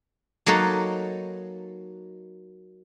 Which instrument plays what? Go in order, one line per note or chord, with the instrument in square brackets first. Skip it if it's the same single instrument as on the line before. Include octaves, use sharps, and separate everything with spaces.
[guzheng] F#3 A#3 D#4 A4 B4 C#5